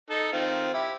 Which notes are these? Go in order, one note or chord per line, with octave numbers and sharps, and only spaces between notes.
D#4 A4
D#3 C4 F4
E4 G4